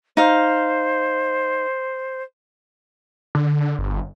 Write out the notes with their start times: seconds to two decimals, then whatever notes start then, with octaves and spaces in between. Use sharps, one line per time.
0.17 D#4 C5 F5
3.35 D3
3.79 G1